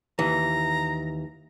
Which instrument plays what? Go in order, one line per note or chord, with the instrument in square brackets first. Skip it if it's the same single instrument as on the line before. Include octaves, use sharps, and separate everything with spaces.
[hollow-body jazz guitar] D#2 E3 [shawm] A#5